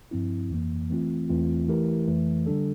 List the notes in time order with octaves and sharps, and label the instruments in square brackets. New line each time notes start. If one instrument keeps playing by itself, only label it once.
[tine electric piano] G2 F3 C4 E4
F2 E3 A#3
E3 A3 C4 F4
E2 E3 A3 C4 F4
E3 A3 E4 G4 A#4
F2 E3 A3
D3 G3 D4 A4